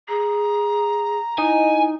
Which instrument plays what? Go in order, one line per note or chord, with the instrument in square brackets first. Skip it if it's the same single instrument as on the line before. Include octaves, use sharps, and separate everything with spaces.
[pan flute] G#4 [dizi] A#5
[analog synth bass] D#4 [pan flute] E4 [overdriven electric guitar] G#5